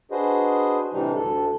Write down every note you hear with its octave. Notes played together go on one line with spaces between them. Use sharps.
D4 F#4 G#4 B4 C5 D#5
A2 C3 E3 G3 D4 D#4
D2 A4